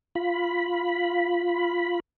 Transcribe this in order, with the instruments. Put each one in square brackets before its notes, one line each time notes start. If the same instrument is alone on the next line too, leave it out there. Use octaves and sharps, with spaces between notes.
[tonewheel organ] F4 B5